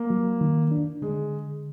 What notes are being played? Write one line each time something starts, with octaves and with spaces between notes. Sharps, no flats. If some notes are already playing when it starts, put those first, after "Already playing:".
Already playing: A#3
F#3
D#3
D4
D3 G#3